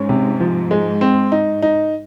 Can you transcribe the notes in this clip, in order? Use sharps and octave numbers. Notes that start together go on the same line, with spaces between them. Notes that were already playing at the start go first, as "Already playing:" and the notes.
Already playing: G#2 C#4
C3
F3
G#3
C4
D#4
D#4